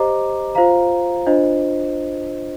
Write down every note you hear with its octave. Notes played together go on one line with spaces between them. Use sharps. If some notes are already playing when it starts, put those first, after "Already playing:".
Already playing: G4 C5 D#5 A#5 D6
F4 C5 F5 A#5
D4 F4 C5 D#5